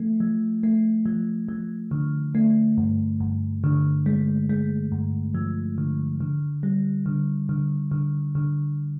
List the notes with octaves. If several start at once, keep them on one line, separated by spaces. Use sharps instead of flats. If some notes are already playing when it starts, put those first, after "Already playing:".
Already playing: F3 A3
F3
A3
F3
F3
D3
A3
G2
G2
D3
G#3
G#3
G2
F3
D3
D3
G3
D3
D3
D3
D3